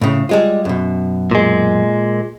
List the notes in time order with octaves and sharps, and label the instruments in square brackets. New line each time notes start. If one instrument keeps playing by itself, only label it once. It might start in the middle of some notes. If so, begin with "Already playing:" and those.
[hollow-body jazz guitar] A2 C#3
G3 G#3 F4
F#2 B2
[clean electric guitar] A#2 G#3